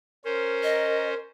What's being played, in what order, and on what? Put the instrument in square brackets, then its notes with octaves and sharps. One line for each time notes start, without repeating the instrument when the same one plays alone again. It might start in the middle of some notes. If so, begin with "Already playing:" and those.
[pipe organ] C#4 C5 [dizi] A#4
[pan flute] D#5